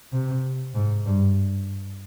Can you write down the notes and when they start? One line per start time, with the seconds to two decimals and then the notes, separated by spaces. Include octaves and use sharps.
0.13 C3
0.75 G#2
1.06 G2